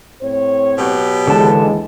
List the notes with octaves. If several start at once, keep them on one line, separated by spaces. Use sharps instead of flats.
A2 C4 C#5
B2 F#3 G4
D#2 D3 E3 G#3 A5